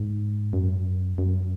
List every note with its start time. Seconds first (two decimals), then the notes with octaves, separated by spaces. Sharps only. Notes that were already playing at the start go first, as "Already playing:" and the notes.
Already playing: G#2
0.53 F#2
1.18 F#2